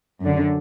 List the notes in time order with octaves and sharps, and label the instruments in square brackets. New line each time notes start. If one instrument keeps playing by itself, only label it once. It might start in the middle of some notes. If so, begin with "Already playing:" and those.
[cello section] F#2 D3